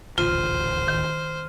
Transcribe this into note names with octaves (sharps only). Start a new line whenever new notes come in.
D#1 A1 D2 F4 C5 F6 D#7
D#3